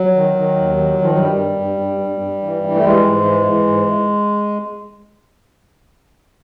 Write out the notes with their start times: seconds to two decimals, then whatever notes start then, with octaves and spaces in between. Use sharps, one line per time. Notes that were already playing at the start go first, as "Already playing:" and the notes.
Already playing: F#3
0.15 D#3
0.36 D#3
0.56 D#2
0.77 D#3
0.98 D#3 F3
1.10 F#3
1.18 G2 G3
1.39 G2
1.60 G2
1.81 G2
2.01 G2
2.21 G2
2.42 E3
2.63 E3
2.75 A3
2.83 E3 G#3
3.05 G#2
3.25 E3
3.46 E3
3.67 G#2